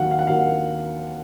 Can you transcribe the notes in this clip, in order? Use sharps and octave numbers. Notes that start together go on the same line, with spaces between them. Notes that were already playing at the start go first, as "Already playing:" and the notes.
Already playing: D#2 D#3 F#3 F5 F#5
F5
F#5
D#2 D#3 F#3 F5